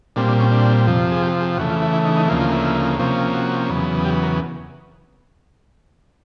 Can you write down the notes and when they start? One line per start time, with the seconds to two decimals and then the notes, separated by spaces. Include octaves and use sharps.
0.16 A#2 G3 C4 D4
0.28 D4
0.40 C#4
0.52 D4
0.87 F2 C3 F3
1.12 G#4
1.22 G4
1.40 G#4
1.58 C#3 E3 A3 F#4
1.69 F4
1.82 E4
1.93 E4
2.05 D#4
2.17 D#4
2.28 D2 C#3 F3 A#3 E4
2.40 F4
2.52 E4
2.99 C3 F3 A#3 C#4
3.34 F#4
3.70 E2 C#3 F#3 B3
4.05 G4
4.23 A#4